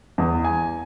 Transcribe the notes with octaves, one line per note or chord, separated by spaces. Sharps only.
E2
G#5